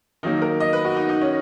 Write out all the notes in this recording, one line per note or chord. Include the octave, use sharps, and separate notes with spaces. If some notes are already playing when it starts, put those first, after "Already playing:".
D#3 F#3 A#3 D#4
A#4
D#5
B4
F#4
D#4
D#4
C#4